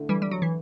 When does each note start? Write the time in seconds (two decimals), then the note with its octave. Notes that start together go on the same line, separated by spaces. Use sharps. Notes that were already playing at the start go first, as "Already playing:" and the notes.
Already playing: D3 A3 E4
0.09 E3 G3
0.22 G3
0.31 F#3
0.42 E3